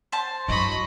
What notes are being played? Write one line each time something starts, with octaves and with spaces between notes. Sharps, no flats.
C5 A5
G2 F#3 E4 D#5 B5 C#6